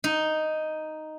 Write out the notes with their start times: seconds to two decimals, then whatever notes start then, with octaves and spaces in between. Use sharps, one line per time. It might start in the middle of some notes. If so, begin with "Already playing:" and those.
0.04 D#4